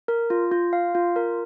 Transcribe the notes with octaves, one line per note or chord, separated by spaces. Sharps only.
A#4
F4
F4
F5
F4
A#4